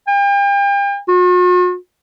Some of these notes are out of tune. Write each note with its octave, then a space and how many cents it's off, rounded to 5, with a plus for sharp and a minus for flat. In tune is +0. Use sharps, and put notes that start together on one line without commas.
G5 +40
F#4 -45